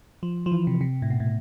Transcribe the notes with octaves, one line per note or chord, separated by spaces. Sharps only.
F3
F3
E3
C3
C3
A2
B2
A2